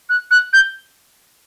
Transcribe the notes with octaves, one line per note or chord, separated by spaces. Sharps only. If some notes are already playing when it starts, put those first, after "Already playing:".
F#6
F#6
G6